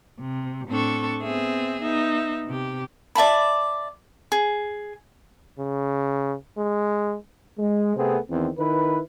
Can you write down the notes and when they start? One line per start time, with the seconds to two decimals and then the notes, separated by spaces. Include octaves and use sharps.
0.20 C3
0.68 A2 C4 D4 A4 C#6
1.22 B3 C4 G#4 E5
1.82 B3 D#4 E5
2.45 C3 G4
3.15 D5 E5 A5 B5
4.32 G#4
5.59 C#3
6.58 G#3
7.59 G#3
7.96 C3 A3 B3 C4 G#4
8.30 E2 D#3 C4
8.59 D#3 E4 B4